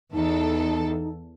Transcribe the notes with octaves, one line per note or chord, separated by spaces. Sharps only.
E2 D#4 A4